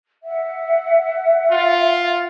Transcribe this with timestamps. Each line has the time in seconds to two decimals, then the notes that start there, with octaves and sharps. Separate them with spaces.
0.24 E5 F#5
1.51 F4